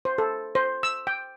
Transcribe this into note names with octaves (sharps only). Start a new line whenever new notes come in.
C5
A4
C5
E6
G5